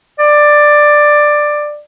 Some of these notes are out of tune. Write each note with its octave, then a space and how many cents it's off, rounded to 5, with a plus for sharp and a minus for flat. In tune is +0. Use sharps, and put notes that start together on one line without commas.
D5 +10